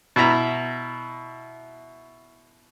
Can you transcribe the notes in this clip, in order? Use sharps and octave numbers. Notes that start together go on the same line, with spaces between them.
B2 E4 E5 A#5